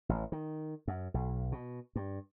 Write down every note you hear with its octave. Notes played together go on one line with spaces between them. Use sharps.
A1
D#3
F#2
B1
B2
G2